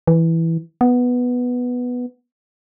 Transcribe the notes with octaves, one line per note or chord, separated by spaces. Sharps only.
E3
B3